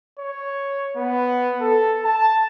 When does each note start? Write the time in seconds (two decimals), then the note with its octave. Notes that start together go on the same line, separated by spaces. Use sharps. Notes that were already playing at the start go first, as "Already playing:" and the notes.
0.19 C#5
0.97 B3
1.61 A4
2.05 A5